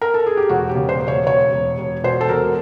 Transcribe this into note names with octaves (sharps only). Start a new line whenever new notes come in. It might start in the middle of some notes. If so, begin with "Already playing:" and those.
A#4
A4
G#4
G4
E1 F#4
G4
C#3
C5
E1
C#5
E1 C#5
E1
E1
B2 C5
A4
E1 A#4